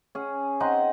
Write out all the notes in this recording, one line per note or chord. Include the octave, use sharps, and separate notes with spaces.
C#4 G#4
C4 D#4 F#5 C6